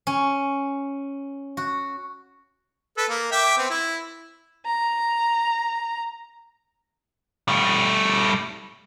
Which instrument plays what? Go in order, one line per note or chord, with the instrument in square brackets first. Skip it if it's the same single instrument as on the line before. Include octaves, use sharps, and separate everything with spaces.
[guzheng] C#4
F#4
[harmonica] A4 B4
A#3
E5 G5 D6
B3 C4
E4
[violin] A#5
[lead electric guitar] G3 A3